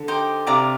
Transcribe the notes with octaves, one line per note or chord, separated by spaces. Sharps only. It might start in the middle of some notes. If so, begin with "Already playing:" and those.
Already playing: D3
D#4 G4 C5 G5
C3 D5 F5 A#5 D6